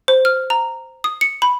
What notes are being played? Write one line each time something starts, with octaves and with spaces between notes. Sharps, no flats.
C5
F6
A#5
D#6
C#7
B5